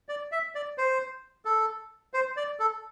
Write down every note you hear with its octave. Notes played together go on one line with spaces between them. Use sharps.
D5
E5
D5
C5
A4
C5
D5
A4